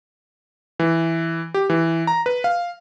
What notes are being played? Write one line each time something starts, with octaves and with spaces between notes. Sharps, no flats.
E3
G4
E3
A#5
B4
F5